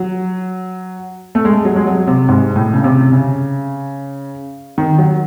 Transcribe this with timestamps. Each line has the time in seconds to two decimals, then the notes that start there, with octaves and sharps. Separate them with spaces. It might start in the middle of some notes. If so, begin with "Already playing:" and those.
Already playing: F#3
1.35 A3
1.45 G#3
1.65 F#3
1.76 G#3
1.87 F#3
2.07 C3
2.28 G#2
2.56 A2
2.74 C#3
2.84 C3
3.12 C#3
4.78 D#3
4.98 F#3